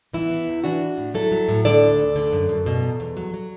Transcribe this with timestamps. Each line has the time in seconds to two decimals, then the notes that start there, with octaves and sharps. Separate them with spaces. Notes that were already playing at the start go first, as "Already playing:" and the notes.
0.13 E3 B3 E4
0.31 E3
0.47 E2
0.64 E3 D4 F#4
0.81 E3
0.98 A2
1.14 F#3 E4 A4
1.32 F#3
1.48 A2
1.65 D3 A4 D5
1.82 D2
1.99 D2
2.16 D3
2.33 F#2
2.49 F#2
2.66 B2
2.83 E2
3.00 E2
3.17 F#3
3.34 F#3